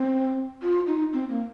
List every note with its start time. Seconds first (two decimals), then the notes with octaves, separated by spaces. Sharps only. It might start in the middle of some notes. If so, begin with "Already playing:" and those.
Already playing: C4
0.63 F4
0.87 D#4
1.13 C4
1.29 A#3